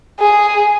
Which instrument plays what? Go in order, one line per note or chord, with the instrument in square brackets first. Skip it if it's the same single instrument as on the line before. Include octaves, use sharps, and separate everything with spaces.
[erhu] G#4